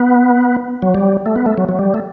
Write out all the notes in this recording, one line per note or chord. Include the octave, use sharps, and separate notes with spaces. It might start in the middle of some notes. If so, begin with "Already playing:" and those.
Already playing: B3
F#3
G3
A3
B3
A3
F#3
F#3
G3
A3